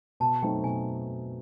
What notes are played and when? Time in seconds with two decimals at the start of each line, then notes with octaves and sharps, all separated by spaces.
0.20 B2 A5
0.42 F#3 A3 C4 D#4 G5
0.63 B2 G#5